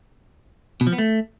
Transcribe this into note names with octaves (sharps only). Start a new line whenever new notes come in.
B2
F3
B3
A3